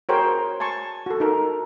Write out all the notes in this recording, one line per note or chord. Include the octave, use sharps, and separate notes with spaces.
F#4 G#4 A#4 C5 C#5 G5
G#5 A5 C6 C#6
F#4 A4
D#4 A4 A#4